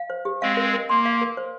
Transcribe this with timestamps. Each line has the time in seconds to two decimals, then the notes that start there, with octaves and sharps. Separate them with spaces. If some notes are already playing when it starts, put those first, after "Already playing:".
Already playing: F5
0.10 C5
0.25 G4
0.42 G#3 C4 F5
0.57 A#4
0.74 A#4
0.89 A#3 C6
1.06 F5
1.21 A#4
1.37 C5